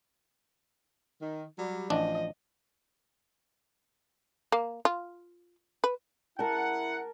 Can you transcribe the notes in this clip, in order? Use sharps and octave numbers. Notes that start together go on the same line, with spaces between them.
D#3
F#3 G3
A1 F3 D4 D#5
A#3
F4
B4
E4 A#4 F#5 A5